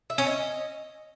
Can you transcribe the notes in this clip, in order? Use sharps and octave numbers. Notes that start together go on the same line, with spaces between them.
E5
C#4
D#5